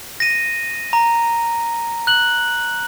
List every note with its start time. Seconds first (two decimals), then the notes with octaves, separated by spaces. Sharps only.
0.20 A#6 D#7
0.93 A#5
2.07 F#6 F#7